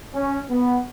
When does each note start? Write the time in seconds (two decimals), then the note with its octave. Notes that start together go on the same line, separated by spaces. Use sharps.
0.14 C#4
0.50 B3